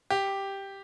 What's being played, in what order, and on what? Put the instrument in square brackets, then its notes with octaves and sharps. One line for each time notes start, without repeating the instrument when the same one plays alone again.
[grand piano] G4